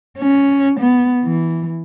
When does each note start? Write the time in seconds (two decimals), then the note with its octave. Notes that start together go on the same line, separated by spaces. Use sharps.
0.17 C#4
0.80 B3
1.23 E3